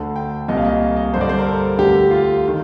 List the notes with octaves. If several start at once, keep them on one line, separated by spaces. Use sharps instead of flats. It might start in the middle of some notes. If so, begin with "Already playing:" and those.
Already playing: D2 D3 A5
G5
C2 A#2 D#5
F5
D#5
D#5
G2 D3 C5
D5
C5
A#4
A4
D2 D3 G4
F4
D#3